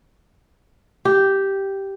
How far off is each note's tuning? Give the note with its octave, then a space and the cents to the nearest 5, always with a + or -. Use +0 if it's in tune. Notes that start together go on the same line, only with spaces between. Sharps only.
G4 -5